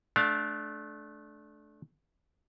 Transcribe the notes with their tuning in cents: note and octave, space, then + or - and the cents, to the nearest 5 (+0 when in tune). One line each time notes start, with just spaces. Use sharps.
A3 -25 D4 +0 F5 +20